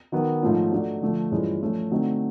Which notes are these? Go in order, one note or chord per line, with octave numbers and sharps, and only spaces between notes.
D#3 F#3 B3
G#2 F3 A3 C#4 F4
F#3 A3 D4
D3 F3 A3
G2 E3 G#3 C#4 F4
F3 A3 C#4
D3 F#3 A3 C4 D#4